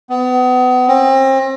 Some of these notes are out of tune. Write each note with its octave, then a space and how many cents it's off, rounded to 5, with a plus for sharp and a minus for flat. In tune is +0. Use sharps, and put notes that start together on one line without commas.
B3 +30
C4 +35